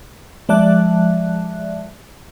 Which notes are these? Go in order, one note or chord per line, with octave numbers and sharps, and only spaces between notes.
F3 G#3 D5 E5 A5 F#6